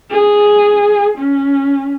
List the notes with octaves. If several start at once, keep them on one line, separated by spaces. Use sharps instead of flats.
G#4
C#4